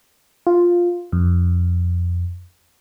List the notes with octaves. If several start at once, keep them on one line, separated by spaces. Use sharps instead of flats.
F4
F2